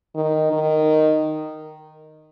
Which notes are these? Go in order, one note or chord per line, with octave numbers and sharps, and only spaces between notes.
D#3
D#3